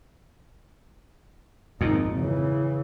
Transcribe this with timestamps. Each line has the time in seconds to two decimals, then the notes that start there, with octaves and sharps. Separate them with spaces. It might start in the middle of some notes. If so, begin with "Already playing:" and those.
1.81 G#1 F2 A#2 D#4
2.16 C#3 E3